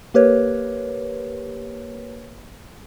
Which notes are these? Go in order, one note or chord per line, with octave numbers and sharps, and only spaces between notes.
A#3 G4 A#4 B4 C#5